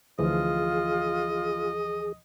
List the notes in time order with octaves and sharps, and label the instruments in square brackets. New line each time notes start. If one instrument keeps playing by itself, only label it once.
[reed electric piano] D2 E3 F3 [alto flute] F4 [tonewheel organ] G#4 [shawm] D#5